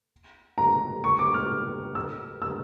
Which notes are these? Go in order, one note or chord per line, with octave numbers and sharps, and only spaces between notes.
A#5
C#6
D6
F6
E6
E6